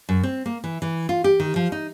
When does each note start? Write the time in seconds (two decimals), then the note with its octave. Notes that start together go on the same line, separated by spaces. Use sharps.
0.09 F#2
0.23 C4
0.46 A#3
0.64 E3
0.82 E3
1.09 F4
1.24 G4
1.40 D#3
1.56 F3
1.72 D#4